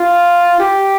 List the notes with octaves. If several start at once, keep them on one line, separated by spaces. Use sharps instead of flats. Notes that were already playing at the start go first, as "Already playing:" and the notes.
Already playing: F4
G4